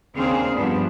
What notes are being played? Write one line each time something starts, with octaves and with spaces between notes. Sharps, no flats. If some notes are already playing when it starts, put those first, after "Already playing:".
D#2 C#3 C4 D4 G#4 F5
G2 F3 B3 D4